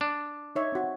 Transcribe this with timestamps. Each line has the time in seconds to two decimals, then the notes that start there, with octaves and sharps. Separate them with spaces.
0.01 D4
0.56 D#4 C#5 E5
0.72 C4 F#4